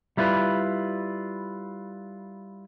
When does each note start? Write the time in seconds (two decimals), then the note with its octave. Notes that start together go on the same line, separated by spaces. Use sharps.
0.17 G3 E4 F4 B4